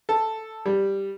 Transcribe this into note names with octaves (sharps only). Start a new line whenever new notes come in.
A4
G3